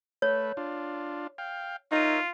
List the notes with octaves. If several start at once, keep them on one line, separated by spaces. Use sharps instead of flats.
A3 B4 C#5
D4 F4
F5 G5
D#4 F4 A#4 C#5 E5